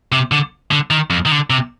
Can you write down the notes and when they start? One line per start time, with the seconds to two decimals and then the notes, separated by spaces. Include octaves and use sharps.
0.12 C3
0.32 D3
0.71 D3
0.90 D#3
1.10 F2
1.26 D#3
1.31 D3
1.50 C3